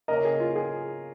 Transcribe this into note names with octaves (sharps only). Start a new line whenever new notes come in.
C#3 A#3 C#4 A#4 D#5
G#4
F4
G#4